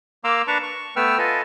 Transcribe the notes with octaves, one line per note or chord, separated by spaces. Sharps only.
A#3 F5 A#5 C6 D6 E6
D4 B4 A5 A#5 C#6
C#6
A3 B3 B4 G5 E6 F6
F4 A4 B4 D#5 G#5